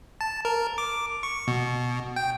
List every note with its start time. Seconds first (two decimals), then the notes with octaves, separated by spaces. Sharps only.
0.21 A5
0.45 A#4
0.78 D6
1.23 C#6
1.48 B2
2.16 G5